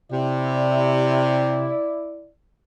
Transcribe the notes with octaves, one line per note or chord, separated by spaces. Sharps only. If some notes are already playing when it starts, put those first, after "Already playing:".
C3 E4 D5